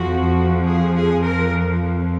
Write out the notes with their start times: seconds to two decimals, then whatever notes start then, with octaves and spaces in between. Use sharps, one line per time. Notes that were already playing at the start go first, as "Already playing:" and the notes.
Already playing: F2 F3 F#4
0.63 G#4
0.93 G#4
1.22 A#4